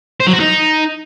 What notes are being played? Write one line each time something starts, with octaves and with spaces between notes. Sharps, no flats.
C5
F#3
F#4
D#4